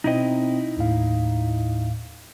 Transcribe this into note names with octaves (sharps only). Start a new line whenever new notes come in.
B2 C4 D#4 E4 D#5
D#2 A2 F5